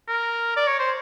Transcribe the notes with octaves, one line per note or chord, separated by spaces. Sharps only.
A#4
D5
C#5
C5